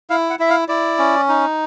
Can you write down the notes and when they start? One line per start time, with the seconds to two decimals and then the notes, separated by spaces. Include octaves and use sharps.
0.10 E4 F5
0.30 F#5
0.39 E4 E5
0.50 F5
0.68 E4 D5
0.99 C#4
1.28 D#4